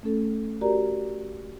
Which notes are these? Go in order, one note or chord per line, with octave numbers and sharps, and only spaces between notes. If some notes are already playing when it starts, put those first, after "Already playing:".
A3 C#4 A4
F#4 G4 A#4 D5 A#5